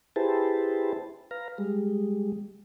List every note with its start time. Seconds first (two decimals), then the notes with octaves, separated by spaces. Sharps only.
0.16 E4 G4 G#4 B4 C5 A5
1.31 B4 F5 A#5
1.58 G3 G#3